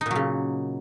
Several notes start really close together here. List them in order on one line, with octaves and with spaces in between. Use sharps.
D#4 A#2 F#3 C#3